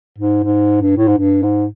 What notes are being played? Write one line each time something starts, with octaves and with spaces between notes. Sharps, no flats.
G#2
G#2
G2
A2
G#2
G2
G#2